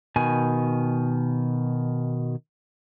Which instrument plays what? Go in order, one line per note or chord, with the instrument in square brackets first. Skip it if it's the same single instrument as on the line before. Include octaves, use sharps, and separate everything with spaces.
[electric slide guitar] B2 D#3 G#5